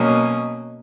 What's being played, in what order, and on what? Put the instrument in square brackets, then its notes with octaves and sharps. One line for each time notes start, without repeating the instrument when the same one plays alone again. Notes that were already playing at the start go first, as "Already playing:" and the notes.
Already playing: [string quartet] B2 F#3 A#3 C#4 D#5